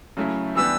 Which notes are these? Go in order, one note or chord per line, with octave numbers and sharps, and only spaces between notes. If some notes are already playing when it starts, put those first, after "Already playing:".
C#3 F#3 A3 E4
E3 G3 B3 D4 G4 E6